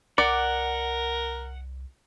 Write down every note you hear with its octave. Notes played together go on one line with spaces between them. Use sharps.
C2 A#4 D5 F#5